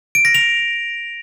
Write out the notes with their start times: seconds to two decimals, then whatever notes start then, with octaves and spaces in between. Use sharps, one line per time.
0.15 D7
0.25 A#6
0.35 F7